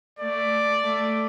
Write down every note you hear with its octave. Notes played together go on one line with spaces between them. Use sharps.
A3 D5
A3